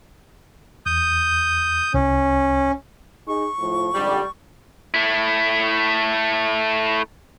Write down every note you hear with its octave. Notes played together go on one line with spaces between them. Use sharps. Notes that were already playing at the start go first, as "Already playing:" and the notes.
E2 D#6 G6
C2 C#4
D#4 G#4 C#6
A2 F3
F2 G#2 D3 G3
A3 E4